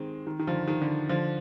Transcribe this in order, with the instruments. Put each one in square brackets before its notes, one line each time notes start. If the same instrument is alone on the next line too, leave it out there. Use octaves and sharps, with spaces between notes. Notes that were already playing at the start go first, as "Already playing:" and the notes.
Already playing: [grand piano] D#3 G#3 C4
D#3
D#3
D3 F3
D#3
D3
D3 F3